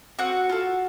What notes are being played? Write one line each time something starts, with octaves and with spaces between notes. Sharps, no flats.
C4 F#4 F#5
F4 A4